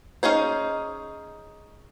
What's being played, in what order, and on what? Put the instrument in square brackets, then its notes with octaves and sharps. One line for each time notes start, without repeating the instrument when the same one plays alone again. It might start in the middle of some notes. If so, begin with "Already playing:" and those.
[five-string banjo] C#4 D#4 G#4 C5